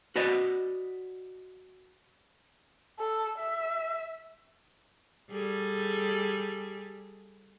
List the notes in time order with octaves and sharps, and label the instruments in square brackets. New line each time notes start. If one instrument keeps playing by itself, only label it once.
[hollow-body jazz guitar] F#4 B4 D5 D#5
[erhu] A4
E5
[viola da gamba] G3 G#4 A4